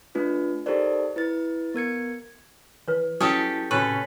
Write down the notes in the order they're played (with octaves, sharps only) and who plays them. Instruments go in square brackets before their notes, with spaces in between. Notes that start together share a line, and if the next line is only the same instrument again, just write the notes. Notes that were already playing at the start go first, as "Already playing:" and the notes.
[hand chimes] A3 D4 F4 B4
D#4 G4 A4 A#4 C5 D5
E4 B4 A6
B3 A#4 G#6 C#7
[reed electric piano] E3 [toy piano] B4 C#5
[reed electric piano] F#3 E4 A5 [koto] C#4 G4 A4 [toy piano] D#6
[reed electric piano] A2 C3 [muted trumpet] C#4 [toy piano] F#4 C#6 [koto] A4 B4